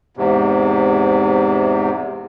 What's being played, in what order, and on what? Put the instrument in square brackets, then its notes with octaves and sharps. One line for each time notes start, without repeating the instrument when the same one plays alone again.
[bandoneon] E2 G#2 C3